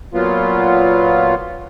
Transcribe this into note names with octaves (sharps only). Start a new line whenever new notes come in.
A#2 F#3 B3 F4